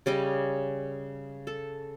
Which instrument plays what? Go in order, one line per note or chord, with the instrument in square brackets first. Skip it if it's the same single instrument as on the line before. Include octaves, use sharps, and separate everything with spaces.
[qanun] C#3 G3 D#5 D6
A4